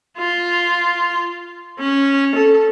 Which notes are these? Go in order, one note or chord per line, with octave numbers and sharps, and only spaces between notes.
F4
C#4
A4